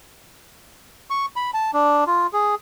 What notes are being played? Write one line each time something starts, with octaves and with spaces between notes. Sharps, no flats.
C#6
B5
A5
D4
F4
G#4